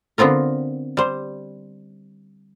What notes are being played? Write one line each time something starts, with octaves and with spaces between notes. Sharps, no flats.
D3 B3 C4 F4 A#4
G3 C5